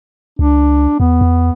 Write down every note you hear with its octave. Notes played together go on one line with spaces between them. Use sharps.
C#2 D4
E2 B3
E2